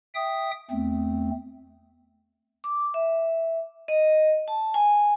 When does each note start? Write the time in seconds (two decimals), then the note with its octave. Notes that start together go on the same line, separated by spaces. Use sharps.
0.15 E5 G5 D#6
0.71 E2 A3 C4
2.64 D6
2.94 E5
3.88 D#5
4.48 A5
4.74 G#5